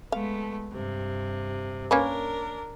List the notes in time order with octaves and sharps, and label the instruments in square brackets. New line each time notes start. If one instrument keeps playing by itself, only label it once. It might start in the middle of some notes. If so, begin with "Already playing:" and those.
[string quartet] G#3 A3 B3 [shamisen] F5
[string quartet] G2 C3
[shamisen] A#3 C#4 B4 [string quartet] D4 A#4